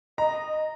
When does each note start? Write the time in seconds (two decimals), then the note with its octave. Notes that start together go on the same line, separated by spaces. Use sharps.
0.18 D#5 A#5